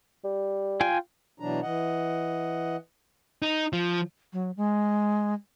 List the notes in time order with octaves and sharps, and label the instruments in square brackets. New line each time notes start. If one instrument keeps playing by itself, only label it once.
[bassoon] G3
[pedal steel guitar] F4 G5 G#5
[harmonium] B2 E3 F#3 D4 A#5
E3 D#5 F#5
[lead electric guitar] D#4
F3
[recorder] F#3
G#3